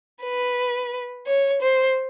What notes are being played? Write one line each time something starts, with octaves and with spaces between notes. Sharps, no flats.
B4
C#5
C5